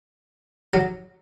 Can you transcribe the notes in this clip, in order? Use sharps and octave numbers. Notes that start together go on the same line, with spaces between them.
F#3